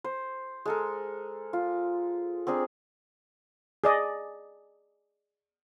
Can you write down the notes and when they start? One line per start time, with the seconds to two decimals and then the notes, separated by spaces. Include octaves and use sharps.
0.04 C5
0.65 G#3 A4 A#4
1.53 F4
2.47 C4 D4 G#4 A#4
3.84 G#4 D5 D#5